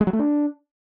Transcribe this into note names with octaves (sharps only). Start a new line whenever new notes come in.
G#3
F#3
A3
D4